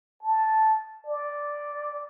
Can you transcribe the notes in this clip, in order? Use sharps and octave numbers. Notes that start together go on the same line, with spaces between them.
A5
D5